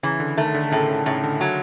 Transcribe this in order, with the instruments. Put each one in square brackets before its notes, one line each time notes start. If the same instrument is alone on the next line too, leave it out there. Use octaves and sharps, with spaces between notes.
[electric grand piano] C#3 [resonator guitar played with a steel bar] E3
[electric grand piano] D3
[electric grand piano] D#3 [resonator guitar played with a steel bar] A3
[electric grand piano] D3
[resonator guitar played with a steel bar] A2 [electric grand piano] C#3
[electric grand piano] C#3
[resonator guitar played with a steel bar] A2 [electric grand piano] C#3
[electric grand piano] D3
[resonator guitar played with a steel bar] F#3